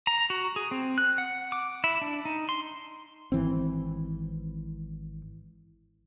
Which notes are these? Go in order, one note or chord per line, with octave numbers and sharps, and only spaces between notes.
A#5
F#4
G#4
C4
F#6
F#5
D6
E4
D4
D#4
C6
G#1 E3 C4